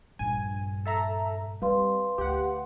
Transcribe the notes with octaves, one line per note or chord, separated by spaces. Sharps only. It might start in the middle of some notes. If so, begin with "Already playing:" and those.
A#1 G2 G#5
A4 E5 A#5
G3 C4 B4 F5 C6
D2 G4 F#5